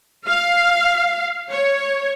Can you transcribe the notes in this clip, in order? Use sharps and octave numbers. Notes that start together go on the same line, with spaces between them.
F5
C#5